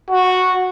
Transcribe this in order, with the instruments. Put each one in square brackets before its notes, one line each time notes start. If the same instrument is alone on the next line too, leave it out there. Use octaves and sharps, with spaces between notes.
[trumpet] F#4